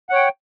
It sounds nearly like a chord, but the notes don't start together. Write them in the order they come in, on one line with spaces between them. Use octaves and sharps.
F#5 C#5 G5